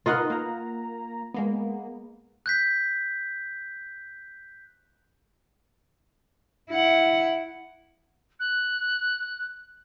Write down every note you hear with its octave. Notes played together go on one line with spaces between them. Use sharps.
D#4 F4 A#4 B4 D#5 F#5
A#3 A#5
G#3 A#3 B3
F#6 G6 B6
E4 F#5
F#6